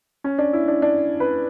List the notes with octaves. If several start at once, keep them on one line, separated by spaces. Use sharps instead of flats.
C#4
D4
E4
D4
D4
B4